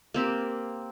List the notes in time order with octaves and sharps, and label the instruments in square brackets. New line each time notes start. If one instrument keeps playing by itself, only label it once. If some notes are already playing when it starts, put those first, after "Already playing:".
[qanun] A#3 C4 G4